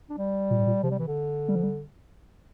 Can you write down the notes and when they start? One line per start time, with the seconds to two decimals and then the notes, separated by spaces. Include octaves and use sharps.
0.10 D4
0.18 G3
0.50 A#2
0.59 A2
0.67 A#2
0.83 C3 F3
0.91 G3
0.99 E3
1.07 D3
1.48 G3
1.55 F3
1.63 G3